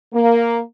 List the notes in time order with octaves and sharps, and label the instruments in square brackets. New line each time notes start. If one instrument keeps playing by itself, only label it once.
[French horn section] A#3